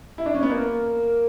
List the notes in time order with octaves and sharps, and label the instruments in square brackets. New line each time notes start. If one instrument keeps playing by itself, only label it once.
[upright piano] E4
D4
C#4
B3
[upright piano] A#3 [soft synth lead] A#4